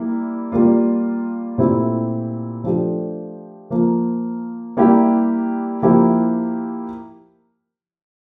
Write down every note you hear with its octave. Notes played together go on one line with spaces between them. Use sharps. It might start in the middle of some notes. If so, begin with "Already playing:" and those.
Already playing: G3 A#3 E4
G3 A#3 F4
A#2 A3 C4 E4 G4
F3 A3 D4 G4
F3 A#3 F4
G3 A#3 E4 G4
F3 A#3 E4 G4